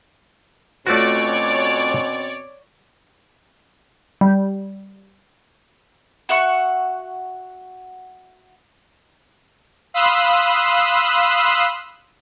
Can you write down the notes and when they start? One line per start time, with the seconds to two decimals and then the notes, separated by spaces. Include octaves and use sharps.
0.87 B2 A3 C4 C#4 F4 F#4 C#5 D5
4.21 G3
6.29 F#4 E5 F#5 C#6
9.94 F5 B5 C6 D#6 E6 F#6